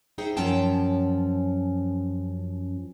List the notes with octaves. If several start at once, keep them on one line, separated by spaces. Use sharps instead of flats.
D#4 G#4 C5 E5 G5
F#2 F3 F#3 C#4 G5 A5